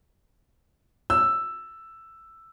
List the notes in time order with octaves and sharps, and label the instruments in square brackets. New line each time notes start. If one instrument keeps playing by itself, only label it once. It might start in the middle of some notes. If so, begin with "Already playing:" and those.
[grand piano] E6